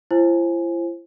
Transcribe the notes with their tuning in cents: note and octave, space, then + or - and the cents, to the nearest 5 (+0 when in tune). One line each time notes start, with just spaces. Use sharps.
E4 +45 C5 +20 G#5 +0